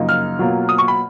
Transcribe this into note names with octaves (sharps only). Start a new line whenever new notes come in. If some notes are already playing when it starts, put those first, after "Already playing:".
Already playing: F#2 C#3 F3 A#3 D#4
F6
B2 F#3 A#3 F4
D#6
C#6
B5